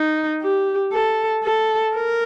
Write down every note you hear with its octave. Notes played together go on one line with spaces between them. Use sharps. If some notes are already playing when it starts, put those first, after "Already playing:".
Already playing: D#4
G4
A4
A4
A#4